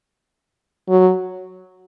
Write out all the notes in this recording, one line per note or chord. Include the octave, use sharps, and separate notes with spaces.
F#3